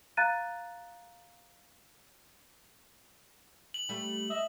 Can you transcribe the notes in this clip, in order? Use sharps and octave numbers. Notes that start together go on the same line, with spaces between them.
F5 A#5 F#6 A6 D#7
F#7
G3 A3
D#5 E5